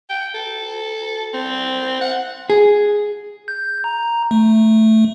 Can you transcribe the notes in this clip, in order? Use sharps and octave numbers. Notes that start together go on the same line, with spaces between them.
G5
A4
C4
F#5
G#4
G6
A#5
A3